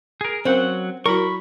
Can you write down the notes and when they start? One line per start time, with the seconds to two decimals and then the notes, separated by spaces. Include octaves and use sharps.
0.21 G#4 A#4
0.45 F#3 C4 C#4 A#4 F5 F#5
1.06 F#3 E4 F#4 A#4 B5 C#6